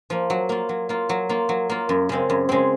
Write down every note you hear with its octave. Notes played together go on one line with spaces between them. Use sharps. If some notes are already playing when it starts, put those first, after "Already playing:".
F3 A#3
F#3
A#3 F4
F#3
A#3 F4
F#3
A#3 F4
F#3
A#3 F4
F#2
C#3 G#3 C4
F#2
C#3 G#3 C4